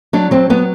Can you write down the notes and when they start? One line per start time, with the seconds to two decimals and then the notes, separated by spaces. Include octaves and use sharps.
0.13 F#3 D4
0.31 F#3 C4
0.50 F#3 B3